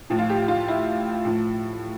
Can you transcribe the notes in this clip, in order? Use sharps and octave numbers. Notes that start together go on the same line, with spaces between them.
A2 F3
F4
G4
F4
E4
A2 F3